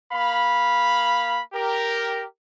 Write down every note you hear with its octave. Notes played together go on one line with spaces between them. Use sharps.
A#3 F5 B5
G4 A#4